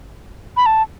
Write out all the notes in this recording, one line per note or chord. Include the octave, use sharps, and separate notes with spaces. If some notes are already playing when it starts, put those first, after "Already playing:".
B5
A5